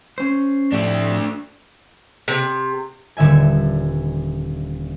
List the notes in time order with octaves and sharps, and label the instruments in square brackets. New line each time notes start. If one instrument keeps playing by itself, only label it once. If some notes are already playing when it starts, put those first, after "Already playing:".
[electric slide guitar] C#4 C5
[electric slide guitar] F2 A2 G4 [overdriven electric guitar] A3 D4
[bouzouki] C3
[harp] D#1 D3 E5 G#5